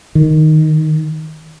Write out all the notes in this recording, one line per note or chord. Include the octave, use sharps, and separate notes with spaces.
D#3